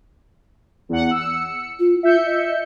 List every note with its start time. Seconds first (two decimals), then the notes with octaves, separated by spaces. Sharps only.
0.89 E2 F#5
1.11 E6 C#7
1.80 F4
2.03 F4 E5 G6 C#7
2.26 D#5